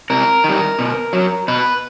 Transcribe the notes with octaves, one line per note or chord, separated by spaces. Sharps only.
C3 A#4
D#3 G3
B2
F#3
B2 B4